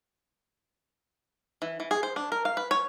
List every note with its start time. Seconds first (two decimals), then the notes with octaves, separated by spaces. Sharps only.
1.62 E3
1.80 E3
1.91 G#4
2.03 C5
2.16 D4
2.32 A#4
2.45 F5
2.57 B4
2.71 C#5